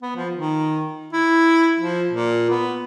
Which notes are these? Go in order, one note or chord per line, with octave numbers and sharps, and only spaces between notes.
B3
F3
D#3
E4
F3
A#2
B3